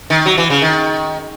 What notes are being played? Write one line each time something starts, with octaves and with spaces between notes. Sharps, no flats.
D#3
F#3
E3
C#3
D#3